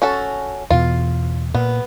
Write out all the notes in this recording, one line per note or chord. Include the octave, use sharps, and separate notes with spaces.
C#4 F#4 A4
E2 B2 F4
A#2 B3